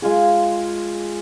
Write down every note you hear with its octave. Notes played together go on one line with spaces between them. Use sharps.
G#3 F4 G#4